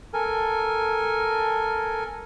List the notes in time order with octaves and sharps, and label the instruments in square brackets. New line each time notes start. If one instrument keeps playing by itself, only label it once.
[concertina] A4 A#4 G#5